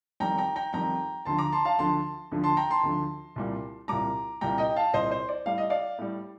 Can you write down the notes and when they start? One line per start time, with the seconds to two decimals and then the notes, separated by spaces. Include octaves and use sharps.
0.20 F2 D#3 G3 G5 A#5
0.38 G5 A#5
0.56 G5 A#5
0.73 F2 D#3 G3 G5 A#5
1.25 D2 D3 F3 A5 C6
1.38 A#5 D6
1.52 A5 C6
1.65 F5 A5
1.79 D2 D3 F3 A5 C6
2.32 D2 D3 F3
2.44 A5 C6
2.57 G5 A#5
2.70 A5 C6
2.83 D2 D3 F3
3.36 C2 A#2 G3
3.88 C2 A#2 G3 A#5 D6
4.41 C2 A#2 G3 G5 A#5
4.58 D#5 G5
4.76 F5 A5
4.93 C2 A#2 G3 C5 D#5
5.11 C5
5.29 D5
5.46 A2 G3 F5
5.58 D#5
5.70 D5 F5
5.98 A2 G3